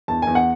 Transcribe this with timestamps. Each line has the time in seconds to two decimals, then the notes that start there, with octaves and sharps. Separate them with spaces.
0.08 E2 A5
0.22 E2 G#5
0.35 F#5